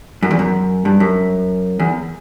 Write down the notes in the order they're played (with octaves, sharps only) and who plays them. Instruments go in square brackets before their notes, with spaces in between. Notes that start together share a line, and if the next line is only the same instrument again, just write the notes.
[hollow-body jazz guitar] F#2
E2
F#2
G2
F#2
E2